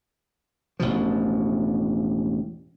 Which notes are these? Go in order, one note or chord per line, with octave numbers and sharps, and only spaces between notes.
E1 A1 B2 F3